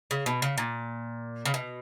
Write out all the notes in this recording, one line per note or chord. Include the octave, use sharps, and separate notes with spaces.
C#3
B2
C#3
A#2
C#3
B2